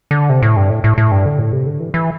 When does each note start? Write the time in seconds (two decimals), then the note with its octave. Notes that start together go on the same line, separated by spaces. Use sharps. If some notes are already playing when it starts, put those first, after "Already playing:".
0.11 D3
0.29 C3
0.42 A2
0.57 G2
0.70 A2
0.84 A2
0.98 A2
1.12 G2
1.26 D3
1.39 A2
1.52 C3
1.66 D3
1.80 E3
1.94 E3